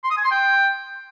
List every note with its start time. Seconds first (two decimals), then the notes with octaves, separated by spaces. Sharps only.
0.04 C6
0.11 D#6
0.17 G#5
0.24 C6
0.31 G5